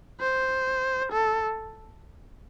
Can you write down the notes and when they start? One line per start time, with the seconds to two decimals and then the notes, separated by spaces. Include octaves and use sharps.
0.21 C5
1.12 A4